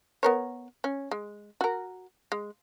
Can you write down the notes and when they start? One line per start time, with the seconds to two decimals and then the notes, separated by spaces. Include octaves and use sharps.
0.23 B3 A#4 C#5
0.84 C#4
1.11 G#3
1.61 F#4 A#4
2.32 G#3